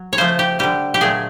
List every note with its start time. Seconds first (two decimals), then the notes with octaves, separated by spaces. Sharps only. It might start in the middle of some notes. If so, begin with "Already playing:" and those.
Already playing: F#3
0.13 C#5
0.18 C#3 F3 A3 C5
0.39 G4
0.59 D3 G3 G4
0.94 G4
1.01 A#2 F#3 A3 G#4